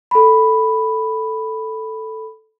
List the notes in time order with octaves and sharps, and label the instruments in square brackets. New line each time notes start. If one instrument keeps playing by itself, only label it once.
[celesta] A4 B5